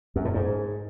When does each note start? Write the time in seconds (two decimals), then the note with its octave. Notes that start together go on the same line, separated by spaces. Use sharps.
0.16 F#2
0.25 A2
0.34 G#2